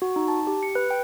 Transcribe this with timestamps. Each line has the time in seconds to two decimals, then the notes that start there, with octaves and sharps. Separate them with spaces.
0.02 F#4
0.16 D#4
0.28 A5
0.47 G4
0.63 C#7
0.75 B4
0.90 G5